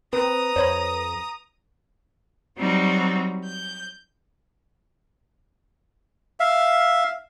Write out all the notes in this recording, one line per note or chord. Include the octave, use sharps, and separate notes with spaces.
C4 B4 A#5 D#6
F2 C5 C#5 B5
F#3 G3 C4 D#4 F#4
G6
E5 F5